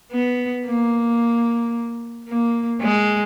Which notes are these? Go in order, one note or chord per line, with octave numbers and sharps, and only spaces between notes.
B3
A#3
A#3
G#3